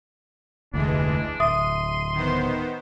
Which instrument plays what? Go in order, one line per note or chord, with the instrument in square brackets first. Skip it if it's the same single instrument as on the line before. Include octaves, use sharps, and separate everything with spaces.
[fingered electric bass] F1 D2 [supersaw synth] E3 G#3 [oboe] D4
[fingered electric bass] D1 [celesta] E5 D#6 [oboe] C6 [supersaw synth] D#7
[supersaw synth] D#3 B3 C5